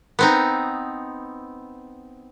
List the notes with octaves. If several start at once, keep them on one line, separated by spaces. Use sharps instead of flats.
B3 C4 D#4